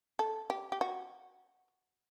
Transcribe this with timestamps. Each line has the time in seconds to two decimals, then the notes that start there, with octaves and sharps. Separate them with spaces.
0.19 A4
0.50 G4
0.72 G4
0.81 F#4